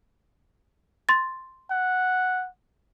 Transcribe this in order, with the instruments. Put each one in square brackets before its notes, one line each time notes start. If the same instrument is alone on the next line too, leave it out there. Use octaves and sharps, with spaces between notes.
[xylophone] C6 A6
[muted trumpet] F#5